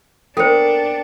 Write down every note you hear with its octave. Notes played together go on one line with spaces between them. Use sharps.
A#3 B3 D4 F#4 A4 C5 G5 C#7